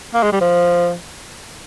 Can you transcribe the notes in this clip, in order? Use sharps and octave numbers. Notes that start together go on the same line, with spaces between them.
A#3
G#3
G3
F3